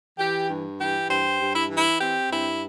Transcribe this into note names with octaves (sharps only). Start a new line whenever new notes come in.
E3 G4
G2
E3 G4
G2 G4 C5
G2
E4
E3
E4
C4 G4
G2 E4